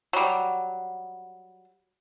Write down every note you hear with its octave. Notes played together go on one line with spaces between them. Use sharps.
F#3 G3